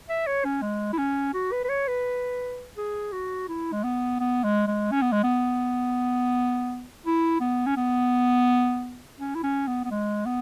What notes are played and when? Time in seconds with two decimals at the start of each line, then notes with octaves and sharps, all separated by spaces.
0.09 E5
0.27 C#5
0.45 C#4
0.62 G#3
0.93 E4
0.98 C#4
1.34 F#4
1.52 B4
1.64 B4
1.69 C#5
1.88 B4
2.77 G#4
3.12 F#4
3.48 E4
3.72 G#3
3.84 B3
4.20 B3
4.44 G#3
4.67 G#3
4.91 C#4
5.02 B3
5.12 G#3
5.23 B3
7.06 E4
7.41 B3
7.66 C#4
7.77 B3
9.20 C#4
9.35 E4
9.43 C#4
9.67 B3
9.85 B3
9.91 G#3
10.26 B3